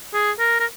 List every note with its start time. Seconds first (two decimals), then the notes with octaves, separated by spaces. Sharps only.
0.13 G#4
0.39 A#4
0.60 A#4